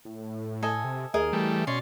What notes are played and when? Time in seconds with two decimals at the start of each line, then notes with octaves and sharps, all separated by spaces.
0.05 A2
0.63 A4 D#5 G#5
0.84 C3
1.14 D#2 G#4 A#4 D#5
1.33 E3 G3 A3
1.67 B2 C#4 D5 C6